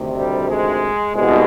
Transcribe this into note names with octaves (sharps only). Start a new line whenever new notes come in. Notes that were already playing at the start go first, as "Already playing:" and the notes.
Already playing: D2 C3 D#3
G3
G#3
C2 B2 G#3